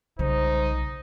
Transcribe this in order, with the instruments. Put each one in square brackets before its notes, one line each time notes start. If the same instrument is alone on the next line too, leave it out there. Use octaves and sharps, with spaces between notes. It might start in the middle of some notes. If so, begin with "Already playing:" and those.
[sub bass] B1 [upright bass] C#3 G3 [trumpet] D#4 [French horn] C5